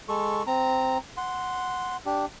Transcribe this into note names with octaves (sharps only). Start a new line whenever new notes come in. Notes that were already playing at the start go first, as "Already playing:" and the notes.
G#3 A4 C#6
C4 A#5
F#5 C6
D4 G4